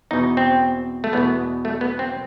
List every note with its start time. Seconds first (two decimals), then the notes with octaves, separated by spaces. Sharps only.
0.11 E2 B2 D#4
0.37 C4
1.04 A3
1.13 E2 B2 B3
1.65 A3
1.81 B3
1.99 C4